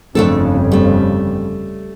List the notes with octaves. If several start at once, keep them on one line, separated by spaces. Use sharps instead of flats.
G1 F2 C#3 A3 D4 A4
G3 A3